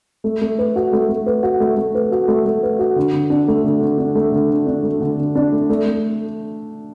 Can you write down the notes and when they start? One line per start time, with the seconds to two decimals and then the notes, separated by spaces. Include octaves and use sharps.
0.24 A3
0.41 A3
0.58 B4
0.76 F#4
0.93 A3
1.09 A3
1.26 B4
1.43 F#4
1.60 A3
1.77 A3
1.95 B4
2.12 F#4
2.28 A3
2.45 A3
2.63 B4
2.79 F#4
2.96 D3
3.13 D3
3.30 D4
3.48 A3
3.64 D3
3.81 D3
3.98 D4
4.15 A3
4.32 D3
4.50 D3
4.67 D4
4.83 A3
5.00 D3
5.17 D3
5.35 D4
5.52 A3
5.69 A3
5.86 A3